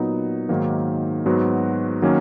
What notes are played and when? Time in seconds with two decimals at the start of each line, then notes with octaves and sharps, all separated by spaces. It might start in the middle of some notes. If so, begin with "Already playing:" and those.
Already playing: A#2 F#3 B3 D#4
0.49 G#2 D#3 F#3 A#3
1.26 G#2 F#3 B3 F#4
2.02 D#3 F#3 A#3 C#4